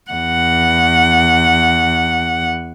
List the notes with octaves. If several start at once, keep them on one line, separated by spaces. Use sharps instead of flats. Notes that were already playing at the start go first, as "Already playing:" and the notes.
E2 F#5